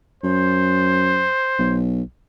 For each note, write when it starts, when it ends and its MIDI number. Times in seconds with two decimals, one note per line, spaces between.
0.23 1.28 42
0.23 1.79 72
1.58 2.02 35